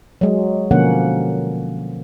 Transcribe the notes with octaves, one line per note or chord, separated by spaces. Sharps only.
F#3 G#3
B2 D3 F3 A#3 C#4 F#5